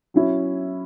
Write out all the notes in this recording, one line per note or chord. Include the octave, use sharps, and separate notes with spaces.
F#3 C#4 E4